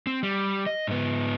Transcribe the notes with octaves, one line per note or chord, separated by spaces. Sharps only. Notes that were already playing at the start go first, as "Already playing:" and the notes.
C4
G3
D#5
G#2 B3